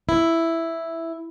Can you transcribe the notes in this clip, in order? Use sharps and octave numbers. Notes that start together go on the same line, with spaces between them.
E4